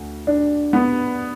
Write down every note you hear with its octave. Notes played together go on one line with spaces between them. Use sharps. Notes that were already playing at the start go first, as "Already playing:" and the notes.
Already playing: D2
D4
B3